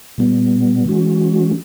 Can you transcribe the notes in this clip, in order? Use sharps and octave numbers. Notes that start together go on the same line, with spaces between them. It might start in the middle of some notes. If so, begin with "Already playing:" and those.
A#2 G3 B3
E3 G#3 C#4 F#4